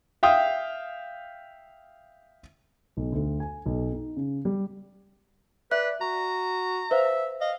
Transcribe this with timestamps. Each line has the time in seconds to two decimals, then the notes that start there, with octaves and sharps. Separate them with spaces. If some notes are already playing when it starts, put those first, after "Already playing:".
0.23 E5 F5 G5 D#6
2.97 B1
3.12 D2
3.40 G#5
3.66 B1
3.93 D#4
4.17 C#3
4.45 G3
5.71 B4 D5 E5 F#6
6.01 F#4 A#5
6.91 B4 C5 E5 F5
7.41 D#5 F5